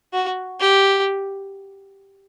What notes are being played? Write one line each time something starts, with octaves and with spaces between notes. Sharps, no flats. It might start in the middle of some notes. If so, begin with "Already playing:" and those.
F#4
G4